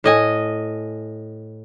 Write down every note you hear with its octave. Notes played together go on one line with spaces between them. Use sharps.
A2 D#5 G#5